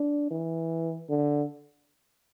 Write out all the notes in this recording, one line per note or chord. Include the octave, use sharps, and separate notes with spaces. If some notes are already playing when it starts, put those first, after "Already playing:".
Already playing: D4
E3
D3